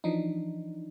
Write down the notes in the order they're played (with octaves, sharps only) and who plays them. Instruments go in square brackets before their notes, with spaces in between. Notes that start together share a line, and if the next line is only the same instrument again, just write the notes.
[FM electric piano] E3 F3 D4 D#4